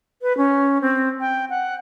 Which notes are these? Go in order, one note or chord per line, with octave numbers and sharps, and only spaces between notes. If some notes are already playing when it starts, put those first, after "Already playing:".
B4
C#4
C4
G5
F#5